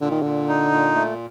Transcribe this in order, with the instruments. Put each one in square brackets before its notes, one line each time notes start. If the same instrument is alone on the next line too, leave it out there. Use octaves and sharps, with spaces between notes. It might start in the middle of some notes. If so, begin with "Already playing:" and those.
[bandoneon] A#2 [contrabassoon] D3
[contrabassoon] D#3
[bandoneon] A#2 [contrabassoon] D3
[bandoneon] D#4
A#2
A3